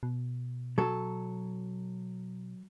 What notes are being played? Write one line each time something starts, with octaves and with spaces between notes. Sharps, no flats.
B2
F#3 A4